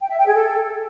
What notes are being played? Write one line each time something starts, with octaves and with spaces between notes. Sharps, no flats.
G5
E5
G5
G#4
A4